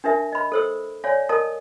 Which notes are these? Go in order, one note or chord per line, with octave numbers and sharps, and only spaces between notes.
D4 D#4 A#4 E5
D#5 B5
A4 C5 E6
C#5 D5 F5 G#5
A#4 D#5 A5 D#6